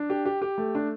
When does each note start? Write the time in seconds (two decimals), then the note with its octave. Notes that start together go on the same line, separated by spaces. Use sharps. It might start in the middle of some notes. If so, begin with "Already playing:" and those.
Already playing: D4
0.10 G4
0.25 G4
0.42 G4
0.58 A3
0.75 D4